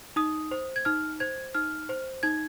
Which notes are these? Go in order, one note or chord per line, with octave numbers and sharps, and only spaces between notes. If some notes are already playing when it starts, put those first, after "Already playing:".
D#4 D#6
C5
G#6
D#4 F6
C5 G#6
D#4 F6
C5
D#4 G#6